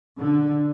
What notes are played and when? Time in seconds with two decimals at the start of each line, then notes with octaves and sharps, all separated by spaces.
0.18 D3